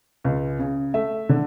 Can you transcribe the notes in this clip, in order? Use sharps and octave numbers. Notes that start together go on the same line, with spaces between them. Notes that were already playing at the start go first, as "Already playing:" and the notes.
C#2
C#3
A3 E5
D3